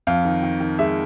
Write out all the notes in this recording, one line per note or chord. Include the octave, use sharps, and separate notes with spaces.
F2 F5
D#3
D#3
D#3
G#3 E5